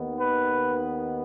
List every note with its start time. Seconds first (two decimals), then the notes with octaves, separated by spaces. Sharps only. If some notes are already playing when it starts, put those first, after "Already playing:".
Already playing: D#2 D#3 B3
0.19 B4